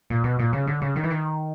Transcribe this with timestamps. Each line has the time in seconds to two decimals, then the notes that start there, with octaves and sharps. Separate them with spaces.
0.10 A#2
0.24 B2
0.39 A#2
0.53 C#3
0.67 D3
0.82 C#3
0.96 D#3
1.03 E3
1.10 D#3